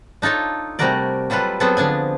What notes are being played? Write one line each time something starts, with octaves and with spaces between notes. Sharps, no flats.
D4 D#4 F4 A4 C#5
C3 G3 A3 F#4 A#4 D5
F#3 G3 F4 A4 B4
F#3 B3 C4 F4 G#4 A4
D3 F3 D4 G#5